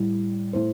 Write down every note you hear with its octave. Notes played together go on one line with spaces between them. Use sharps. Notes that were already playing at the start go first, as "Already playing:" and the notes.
Already playing: A2 G3
A2 A3 C5